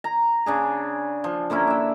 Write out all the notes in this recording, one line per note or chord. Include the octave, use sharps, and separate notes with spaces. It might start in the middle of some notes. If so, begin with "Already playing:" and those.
A#5
C#3 D4 G#4
F3
D3 A#3 C#4 E4
D4 E5